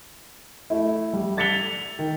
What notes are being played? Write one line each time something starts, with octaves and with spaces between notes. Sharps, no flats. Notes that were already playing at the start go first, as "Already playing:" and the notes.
A3 E4
G3
G#6 A6 B6 C#7 F7 G7
D#3